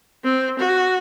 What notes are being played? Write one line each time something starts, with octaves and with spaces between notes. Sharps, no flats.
C4
F#4